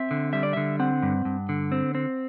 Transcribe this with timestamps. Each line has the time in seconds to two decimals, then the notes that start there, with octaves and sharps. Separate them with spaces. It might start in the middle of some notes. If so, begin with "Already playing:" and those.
Already playing: C4 E5
0.11 D3
0.33 G3 E5
0.43 D5
0.53 D3 E5
0.79 C4 F#5
1.03 G2
1.25 G2
1.49 D3
1.72 C4
1.95 C4